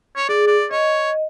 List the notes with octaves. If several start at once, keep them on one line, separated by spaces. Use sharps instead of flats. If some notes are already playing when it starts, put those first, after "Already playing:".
C#5
G#4 D5
D5
C#5 D#5